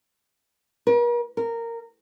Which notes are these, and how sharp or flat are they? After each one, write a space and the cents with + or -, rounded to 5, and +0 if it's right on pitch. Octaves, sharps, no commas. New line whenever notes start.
A#4 +45
A#4 -15